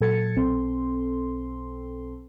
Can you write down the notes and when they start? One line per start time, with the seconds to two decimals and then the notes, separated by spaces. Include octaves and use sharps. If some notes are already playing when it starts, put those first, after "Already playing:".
0.01 A#2 F#3 A4 G#6 A6 C#7
0.36 B1 C4 A4 C6